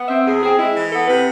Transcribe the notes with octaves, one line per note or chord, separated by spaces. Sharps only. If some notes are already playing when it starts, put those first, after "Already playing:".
Already playing: B3
C4 E5
E2 G#4
C4 G#4
G#3 E4
E3
B3 A4
C3 B4